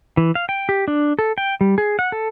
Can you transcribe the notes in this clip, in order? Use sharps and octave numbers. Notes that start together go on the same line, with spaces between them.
E3
F5
G5
G4
D4
A4
G5
G3
G#4
F#5
A4